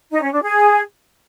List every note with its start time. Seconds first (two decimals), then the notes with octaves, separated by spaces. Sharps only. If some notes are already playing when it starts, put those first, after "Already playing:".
0.11 D#4
0.22 C#4
0.32 D4
0.43 G#4